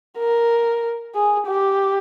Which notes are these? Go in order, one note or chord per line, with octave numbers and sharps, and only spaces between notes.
A#4
G#4
G4